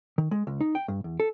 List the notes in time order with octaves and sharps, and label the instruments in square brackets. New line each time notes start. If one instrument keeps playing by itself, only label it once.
[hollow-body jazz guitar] D#3
G#3
C#2
D#4
G5
G2
E2
A4